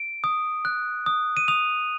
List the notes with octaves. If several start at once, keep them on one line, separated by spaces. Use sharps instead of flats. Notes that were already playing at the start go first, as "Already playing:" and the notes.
Already playing: D7
D#6
F#6
D#6
D#7
D#6 F7